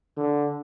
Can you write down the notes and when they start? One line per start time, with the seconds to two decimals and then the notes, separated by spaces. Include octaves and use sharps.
0.17 D3